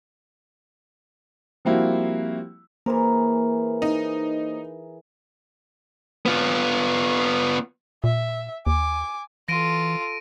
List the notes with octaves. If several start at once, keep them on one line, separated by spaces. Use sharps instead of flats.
F3 G3 A#3 C4 E4 F#4
E3 A#3 G#4 A#4 C5
D#4
B3 F4
A#2 E5
D#2 G#5 D6
E3 F4 A4 A#6 D7 D#7